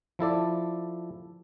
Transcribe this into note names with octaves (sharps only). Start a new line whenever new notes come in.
F3 E4 A4 D5